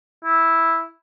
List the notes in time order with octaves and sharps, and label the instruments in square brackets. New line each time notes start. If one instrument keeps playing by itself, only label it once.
[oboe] E4